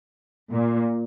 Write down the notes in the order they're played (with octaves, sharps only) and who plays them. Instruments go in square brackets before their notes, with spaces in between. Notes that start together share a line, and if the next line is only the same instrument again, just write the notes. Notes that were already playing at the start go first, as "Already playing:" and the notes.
[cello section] A#2